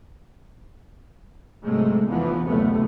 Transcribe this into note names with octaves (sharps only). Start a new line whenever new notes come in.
B1 G#2 C3 G#3 A3
F1 E2 E3 F3 B3
F#1 D2 C3 A3 B3